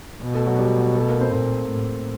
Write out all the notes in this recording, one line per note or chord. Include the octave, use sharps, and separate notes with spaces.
B2
A3 A4
F#3 F#4
G3 G4
A3 A4
A#3 A#4
C4 C5
A#2 C4 C5
A2